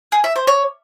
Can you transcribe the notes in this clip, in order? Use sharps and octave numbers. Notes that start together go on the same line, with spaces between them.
G#4
E5
C5
C#5